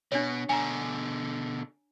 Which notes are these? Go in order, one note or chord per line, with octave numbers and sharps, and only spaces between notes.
B2 D4 G4 C#5
B2 D3 G#5 A#5